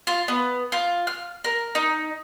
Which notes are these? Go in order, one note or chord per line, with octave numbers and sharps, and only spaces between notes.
F4
B3
F4
F6
A#4
D#4